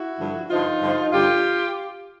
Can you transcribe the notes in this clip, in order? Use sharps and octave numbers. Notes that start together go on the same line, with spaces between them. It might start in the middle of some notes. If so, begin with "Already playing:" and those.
Already playing: E4 F#4
G2 D3 F3
G2 D3 F3 D#4 F4
G2 D3 F3
G2 D3 F3 F4 G4